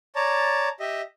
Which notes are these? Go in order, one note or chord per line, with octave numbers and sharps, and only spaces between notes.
C#5 D5 A5 A#5
G4 D#5 E5